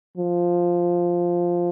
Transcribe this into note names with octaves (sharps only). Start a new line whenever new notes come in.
F3